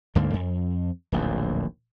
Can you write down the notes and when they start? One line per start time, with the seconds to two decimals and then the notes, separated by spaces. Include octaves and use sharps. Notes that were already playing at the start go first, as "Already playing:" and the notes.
0.15 D2 G#2 D3 A#3
0.34 F2
1.12 D1 A#1 D#2